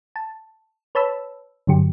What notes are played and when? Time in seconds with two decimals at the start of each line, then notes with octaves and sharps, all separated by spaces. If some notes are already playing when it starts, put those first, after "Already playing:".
0.16 A5
0.95 B4 C#5 A5 B5 E6
1.67 G2 D3 F#3 G4